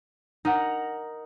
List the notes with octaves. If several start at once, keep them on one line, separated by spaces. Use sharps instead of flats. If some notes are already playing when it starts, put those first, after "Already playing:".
D#4 A#4 F#5